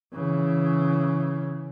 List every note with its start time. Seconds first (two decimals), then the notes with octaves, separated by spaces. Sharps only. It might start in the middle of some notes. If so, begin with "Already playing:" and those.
0.14 C#3 E3